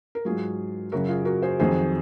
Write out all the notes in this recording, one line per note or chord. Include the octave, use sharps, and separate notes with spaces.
A#4
G#2 F#3 F4 G#4
F#2 C#3 F#3 F#4 A#4
F4 G#4
F#4 A#4
G#4 C5
F2 D#3 F#3 G#4 C5